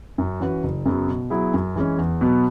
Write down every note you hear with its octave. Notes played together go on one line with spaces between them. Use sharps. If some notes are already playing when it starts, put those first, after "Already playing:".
F#2
E3 C#4 F#4 B4
F#1
F#2 C#3 F#3 B3
B2
F#3 B3 E4 G#4
F#2
E3 G#3 C#4
E2
B2 F#3 B3